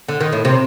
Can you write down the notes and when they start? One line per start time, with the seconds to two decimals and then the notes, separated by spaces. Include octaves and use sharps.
0.08 D3
0.20 D#3
0.32 A2
0.45 C3